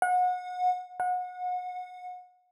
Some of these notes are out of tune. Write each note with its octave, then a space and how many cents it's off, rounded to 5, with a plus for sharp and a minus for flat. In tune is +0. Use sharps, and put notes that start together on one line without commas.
F#5 -30
F#5 -30